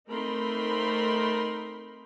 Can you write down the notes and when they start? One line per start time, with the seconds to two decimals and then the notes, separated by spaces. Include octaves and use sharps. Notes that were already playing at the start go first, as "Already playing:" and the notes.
0.10 A3 C4 D#4 A#4 B5 C6